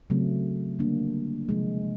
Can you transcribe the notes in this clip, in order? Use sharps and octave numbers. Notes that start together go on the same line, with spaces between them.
C#3 F#3 A3 C4
D3 G3 A#3 D4
C3 F3 G#3